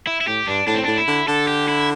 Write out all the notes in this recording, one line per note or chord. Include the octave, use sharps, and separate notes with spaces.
E4
E4
A2 G4
G2 D4
A2 D4
C4
A2 D4
E4
D3
D3 A4
G4
E4